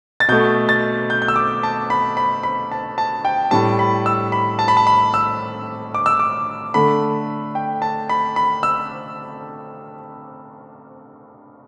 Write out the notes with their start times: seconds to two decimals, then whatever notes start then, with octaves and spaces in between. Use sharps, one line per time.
0.20 A6
0.28 B2 A3 G6
0.69 A6
1.10 G6
1.22 G6
1.28 E6
1.36 D6
1.63 A5
1.90 B5
2.17 B5
2.43 B5
2.72 A5
2.98 A5
3.25 G5
3.51 A2 G3 A5
3.79 B5
4.06 E6
4.32 B5
4.59 A5
4.68 B5
4.77 A5
4.87 B5
5.14 E6
5.94 D6
6.06 E6
6.19 D6
6.74 D3 A3 B5
7.55 G5
7.82 A5
8.09 B5
8.36 B5
8.63 E6